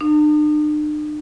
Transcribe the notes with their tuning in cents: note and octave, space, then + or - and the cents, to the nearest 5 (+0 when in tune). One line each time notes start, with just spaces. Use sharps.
D4 +45